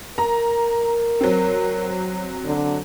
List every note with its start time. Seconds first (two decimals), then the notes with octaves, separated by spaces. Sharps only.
0.18 A#4 A#5
1.21 F#3 C4
2.45 D3